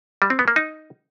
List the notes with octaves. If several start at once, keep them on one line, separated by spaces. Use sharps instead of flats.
G3
C4
B3
A#3
D#4